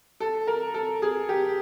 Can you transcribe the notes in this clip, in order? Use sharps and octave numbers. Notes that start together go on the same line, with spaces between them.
A4
A#4
A4
G#4
G4